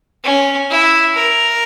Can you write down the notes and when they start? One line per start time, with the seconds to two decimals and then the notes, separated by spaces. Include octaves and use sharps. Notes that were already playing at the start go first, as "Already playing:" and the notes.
0.23 C#4
0.70 E4
1.15 A#4